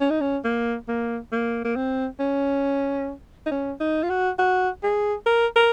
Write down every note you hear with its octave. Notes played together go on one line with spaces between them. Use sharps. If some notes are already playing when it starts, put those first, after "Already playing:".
C#4
D#4
C#4
A#3
A#3
A#3
A#3
C4
C#4
D#4
C#4
D#4
F4
F#4
F#4
G#4
A#4
A#4